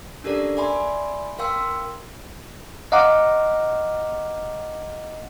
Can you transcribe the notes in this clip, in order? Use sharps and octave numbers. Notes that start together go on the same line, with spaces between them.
C#4 D4 G4 A4 A#4 D5
D5 E5 G#5 B5 C6
A#4 F5 G5 C6 E6
D#5 F5 F#5 A#5 D6